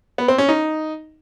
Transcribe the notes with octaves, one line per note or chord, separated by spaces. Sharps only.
B3
C4
C#4
D#4